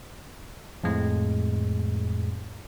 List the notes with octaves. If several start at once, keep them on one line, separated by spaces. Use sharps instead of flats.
F2 A2 G#3